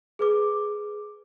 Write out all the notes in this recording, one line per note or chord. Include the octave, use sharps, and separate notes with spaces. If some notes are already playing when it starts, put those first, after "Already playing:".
G#4 B4 D6